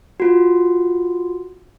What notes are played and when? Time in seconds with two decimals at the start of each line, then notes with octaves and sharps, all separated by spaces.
0.20 F4 F#4